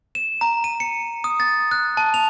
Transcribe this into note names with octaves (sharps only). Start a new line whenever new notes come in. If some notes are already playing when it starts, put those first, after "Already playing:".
E7
A#5
D#7
C#7
D#6
A6
F#6
A5
F7